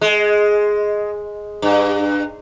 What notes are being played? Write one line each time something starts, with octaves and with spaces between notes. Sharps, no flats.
G#3
G2